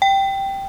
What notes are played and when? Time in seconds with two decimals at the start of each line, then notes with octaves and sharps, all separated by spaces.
0.02 G5